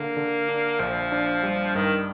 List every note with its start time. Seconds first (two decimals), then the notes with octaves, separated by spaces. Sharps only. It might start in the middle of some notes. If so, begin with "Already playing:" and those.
Already playing: D3 A#3
0.17 D3
0.49 D4
0.79 A#1 F3
1.12 D4
1.43 G3
1.75 G2 D#3